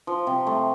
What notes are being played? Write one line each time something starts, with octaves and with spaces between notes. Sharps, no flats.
F3
C3
A3